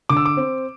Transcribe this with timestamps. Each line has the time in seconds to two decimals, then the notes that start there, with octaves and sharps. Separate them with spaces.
0.09 D3 D6
0.17 E6
0.25 D6
0.37 C4